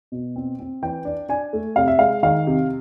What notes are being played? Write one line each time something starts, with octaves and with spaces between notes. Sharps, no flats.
B2
C4
C4
E3 G5
D4
D4 G#5
A3
C3 F5
E5
G#3 F5
D#3 F5
C3